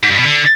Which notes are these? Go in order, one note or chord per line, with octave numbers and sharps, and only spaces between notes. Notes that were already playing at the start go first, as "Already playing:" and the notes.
G#2
G2
B2
D3